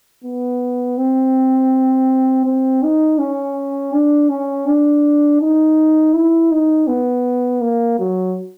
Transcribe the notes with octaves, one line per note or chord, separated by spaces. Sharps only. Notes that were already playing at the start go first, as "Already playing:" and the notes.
B3
C4
C4
D#4
C#4
D4
C#4
D4
D#4
E4
D#4
B3
A#3
F#3